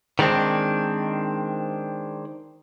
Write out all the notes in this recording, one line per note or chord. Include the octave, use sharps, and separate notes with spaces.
D#3 G3 G#3 C4 D4